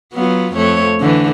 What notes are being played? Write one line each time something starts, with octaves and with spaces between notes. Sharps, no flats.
F#3 B3 F4
F2 A3 C#5
D3 E3